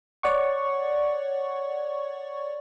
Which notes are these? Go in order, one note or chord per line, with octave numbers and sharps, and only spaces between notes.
C#5 D5 F#5 C#6